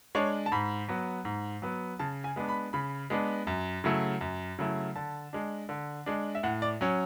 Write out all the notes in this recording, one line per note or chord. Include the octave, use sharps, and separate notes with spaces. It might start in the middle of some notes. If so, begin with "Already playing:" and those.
G#3 D4 C#5
A5
G#2 B5
F#3 B3
G#2
F#3 B3
C#3 A5
G#5
G#3 B3 D4
B5
C#3 B5
G#3 B3 D4
F#2
C#3 F#3 A3 E4
F#2
C#3 F#3 A3 E4
D3 A5
G#3 D4
D3
G#3 D4
E5
A2 F#5
D5
F#3 C#4